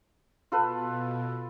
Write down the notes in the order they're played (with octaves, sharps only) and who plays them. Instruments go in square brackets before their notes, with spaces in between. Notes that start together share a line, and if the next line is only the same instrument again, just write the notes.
[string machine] B2 [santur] F4 A4 B4